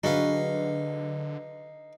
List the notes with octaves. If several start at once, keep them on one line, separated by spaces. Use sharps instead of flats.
D3 F#3 D4 D#4 F#4 G#4 B4 F5